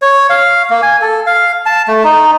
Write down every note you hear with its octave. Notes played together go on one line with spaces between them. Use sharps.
C#5
F5
A#3
G#5
A4
F5
A5
A3
D#4